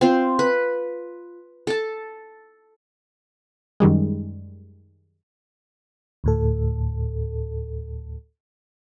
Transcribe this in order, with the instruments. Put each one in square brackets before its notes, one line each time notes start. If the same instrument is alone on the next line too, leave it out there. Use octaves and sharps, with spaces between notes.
[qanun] C4 F4 C5
B4
A4 A5
[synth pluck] F#2 D#3 G3 G#3
[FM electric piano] D2 A2 A4